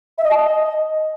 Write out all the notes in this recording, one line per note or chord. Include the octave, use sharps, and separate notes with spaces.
E5
D#5
A5
D#5